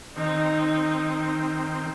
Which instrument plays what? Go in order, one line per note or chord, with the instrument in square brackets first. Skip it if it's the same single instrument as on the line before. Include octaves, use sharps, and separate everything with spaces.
[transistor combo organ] D#3 C4 [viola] D#4